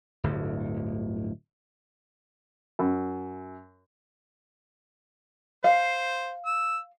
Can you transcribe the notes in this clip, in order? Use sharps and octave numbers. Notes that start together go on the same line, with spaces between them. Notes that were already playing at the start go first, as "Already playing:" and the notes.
D1 G1 D2
F#2
C5 F5
E6